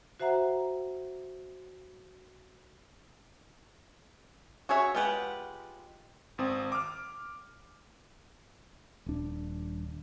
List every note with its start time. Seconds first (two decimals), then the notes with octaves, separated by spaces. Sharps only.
0.20 F#4 C5 E5 F#5 A#5
4.69 F#4 G#4 C#5 E5
4.95 G#3 F4 G4 B4 F#5
6.38 G#1 C4 D#6
6.72 D6 F6
9.06 D#1 D4